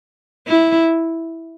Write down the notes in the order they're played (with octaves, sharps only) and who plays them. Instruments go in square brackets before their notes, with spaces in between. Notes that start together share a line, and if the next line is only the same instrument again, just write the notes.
[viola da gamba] E4